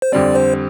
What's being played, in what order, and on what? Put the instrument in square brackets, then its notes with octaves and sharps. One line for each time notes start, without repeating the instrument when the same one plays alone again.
[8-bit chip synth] C5
[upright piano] F2 D3 G3 C4 [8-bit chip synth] D5
[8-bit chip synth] C5